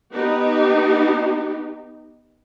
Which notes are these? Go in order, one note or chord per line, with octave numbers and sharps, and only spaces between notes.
B3 D#4 G4